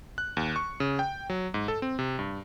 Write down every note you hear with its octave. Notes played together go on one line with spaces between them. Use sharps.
F#6
D#2
C#6
C#3
G5
F#3
G#2
A4
C4
C3
G2